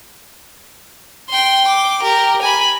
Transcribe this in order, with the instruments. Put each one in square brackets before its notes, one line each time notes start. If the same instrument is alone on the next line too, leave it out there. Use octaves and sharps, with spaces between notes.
[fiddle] G5 C6
D6
G4 A#4
G#5 B5